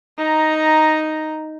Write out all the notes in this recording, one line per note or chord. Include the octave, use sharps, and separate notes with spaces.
D#4 A#5